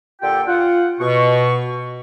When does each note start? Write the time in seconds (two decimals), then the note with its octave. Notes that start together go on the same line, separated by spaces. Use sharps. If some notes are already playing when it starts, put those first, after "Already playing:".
0.22 A#2 D3 F4 G4 A4 G5
0.47 F4 F#5
1.00 B2 C#6